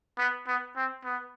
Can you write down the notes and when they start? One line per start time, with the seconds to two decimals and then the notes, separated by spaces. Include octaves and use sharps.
0.18 B3
0.47 B3
0.76 C4
1.04 B3